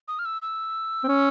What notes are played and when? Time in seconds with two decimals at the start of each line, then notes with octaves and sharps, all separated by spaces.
0.08 D#6
0.19 F6
0.25 E6
0.42 E6
1.04 C4
1.08 C#4